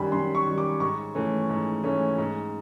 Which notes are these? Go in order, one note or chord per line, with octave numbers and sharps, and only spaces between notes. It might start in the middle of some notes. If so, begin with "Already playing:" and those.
Already playing: F#2 D#3 G3 B5
F#2 C6
C#6
D#3 G3
D6
G#2 C#6
E3 A3 C#4
G#2
E3 A3 C#4
G#2